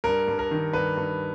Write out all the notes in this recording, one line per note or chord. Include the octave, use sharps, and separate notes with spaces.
G2 A#4
G2
A#4
D#3
G2 B4
G2